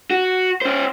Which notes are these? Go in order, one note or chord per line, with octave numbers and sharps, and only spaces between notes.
F#4
C#4 C5